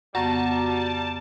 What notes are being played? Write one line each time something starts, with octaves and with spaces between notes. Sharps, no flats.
F2 C#3 G3 B3 F#4 A5 A#5